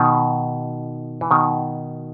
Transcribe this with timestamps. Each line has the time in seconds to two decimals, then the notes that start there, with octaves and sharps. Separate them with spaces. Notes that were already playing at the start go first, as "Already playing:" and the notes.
Already playing: B2 D#3
1.21 E3
1.31 B2 D#3